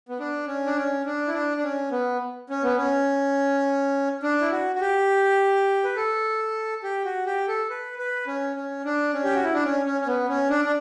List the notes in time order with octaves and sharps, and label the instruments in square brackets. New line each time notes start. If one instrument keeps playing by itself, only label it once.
[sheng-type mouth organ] B3
D4
C#4
D4
C#4
D4
E4
D4
D4
C#4
B3
C#4
B3
C#4
D4
E4
F#4
F#4
G4
B4
A4
G4
F#4
G4
A4
B4
B4
C#4
C#4
D4
C#4
G4
F#4
E4
D4
C#4
C#4
C#4
B3
C#4
D4
D4